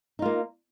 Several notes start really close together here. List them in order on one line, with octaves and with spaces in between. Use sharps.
D#4 F4 A#3